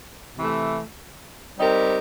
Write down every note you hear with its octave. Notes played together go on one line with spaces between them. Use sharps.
C3 E3 A3
G3 C4 D#4 G4 A#4